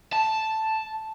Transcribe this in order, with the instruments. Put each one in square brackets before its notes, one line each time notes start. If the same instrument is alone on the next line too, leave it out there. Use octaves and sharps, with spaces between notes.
[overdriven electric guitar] A5